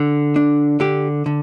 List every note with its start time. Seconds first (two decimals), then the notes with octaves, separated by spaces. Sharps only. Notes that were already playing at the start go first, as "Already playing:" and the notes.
Already playing: D3
0.36 D4
0.80 D3 G4
1.26 D3